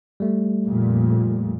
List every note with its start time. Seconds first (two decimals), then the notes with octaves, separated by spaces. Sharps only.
0.20 G3 A3
0.66 F2 A#2